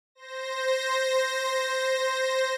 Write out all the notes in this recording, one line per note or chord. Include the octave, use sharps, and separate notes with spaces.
C5 A#6